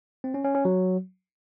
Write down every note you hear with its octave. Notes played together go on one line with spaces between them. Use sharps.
C4
C#4
C#4
C#4
F#3